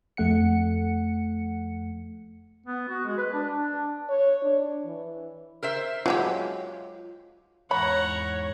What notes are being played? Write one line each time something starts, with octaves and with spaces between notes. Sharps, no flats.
F2 A3 F#5 C#7
B3
F#4
G#3
B4
D4
D4
C#5
D4
E3
A#4 C5 E5
F#3 G#3 F4 G4
E2 G#2 C#5 F#5 A#5 B5